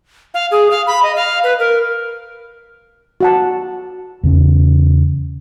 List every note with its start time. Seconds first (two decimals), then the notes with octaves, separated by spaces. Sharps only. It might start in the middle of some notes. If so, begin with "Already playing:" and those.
0.34 F5
0.51 G#4
0.71 F5
0.87 B5
1.03 D#5
1.16 F5
1.44 B4
1.59 A#4
3.21 F#4 F#5 A5
4.23 E2 C#3 C#4